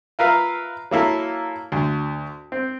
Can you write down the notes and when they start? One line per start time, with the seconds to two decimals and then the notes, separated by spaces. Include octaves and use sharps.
0.19 F4 A#4 B4 E5 F5
0.91 F#3 A#3 E4 A4
1.72 D2
2.52 C4